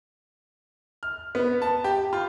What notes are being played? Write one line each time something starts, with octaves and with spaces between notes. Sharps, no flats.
F6
B3
A5
G4
F4